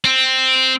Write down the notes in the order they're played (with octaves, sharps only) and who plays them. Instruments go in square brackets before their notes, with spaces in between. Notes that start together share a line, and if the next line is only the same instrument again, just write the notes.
[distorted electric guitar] C4